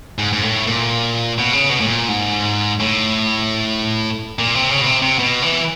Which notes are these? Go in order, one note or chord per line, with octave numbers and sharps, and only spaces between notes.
G#2
G#2
A2
A#2
B2
C#3
B2
A2
A#2
G#2
A2
A#2
C3
C#3
B2
C3
C3
B2
E3